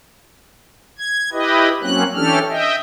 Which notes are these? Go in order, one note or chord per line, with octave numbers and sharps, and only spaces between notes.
G#6
E4 G4 B4 D#5
F#3 A#3 C4 C#4 F#6
E3 C#4 D4 G4 A4 F6
D#5 E5 G5